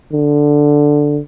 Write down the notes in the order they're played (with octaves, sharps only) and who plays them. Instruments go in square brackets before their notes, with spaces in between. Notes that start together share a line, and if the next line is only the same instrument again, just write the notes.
[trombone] D3